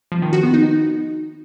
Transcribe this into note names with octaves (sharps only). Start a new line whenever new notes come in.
F3
D#3
F#4
B3
D#4